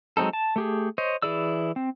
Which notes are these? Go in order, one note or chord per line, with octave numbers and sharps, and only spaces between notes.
F#3 G#3 C4 D#4 A4
A5
A3 G4 G#4
C5 C#5 D#5
E3 E4 G#4 D5 E6
C4